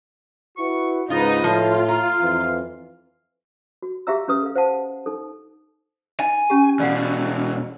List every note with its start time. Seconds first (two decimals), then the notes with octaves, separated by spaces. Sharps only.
0.57 E4 F#4 B4 C#6
1.10 C#2 G#2 D#4 F4 B4 D#5
1.44 A2 F3 F4
1.88 F5 A#5
2.21 F2 E3
3.82 F#4
4.07 G4 G#4 E5 F5 A#5 E6
4.28 C#4 G4 B4 D#6
4.43 A4 F5
4.55 C5 F5 F#5 A5
5.06 D#4 A4
6.20 D#4 G#5
6.50 C#4 G4
6.80 E2 B2 D5 F5 F#5